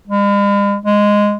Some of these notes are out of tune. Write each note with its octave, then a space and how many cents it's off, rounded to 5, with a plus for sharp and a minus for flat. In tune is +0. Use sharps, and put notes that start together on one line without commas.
G#3 -45
G#3 -5